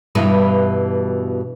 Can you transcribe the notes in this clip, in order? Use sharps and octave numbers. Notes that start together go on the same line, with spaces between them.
G2 B2 E3